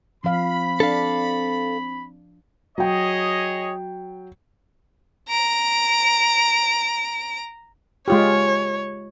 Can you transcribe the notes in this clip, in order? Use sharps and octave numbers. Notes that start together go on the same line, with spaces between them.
F3 C4 F5 B5
D4 A4 F5
F#3 G#4 C#5 D#5 G5
A#5 D7
G#3 F4 G4 C#5